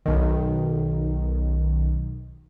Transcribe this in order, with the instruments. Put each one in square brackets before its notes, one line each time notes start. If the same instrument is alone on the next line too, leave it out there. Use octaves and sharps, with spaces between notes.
[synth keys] B1 D#3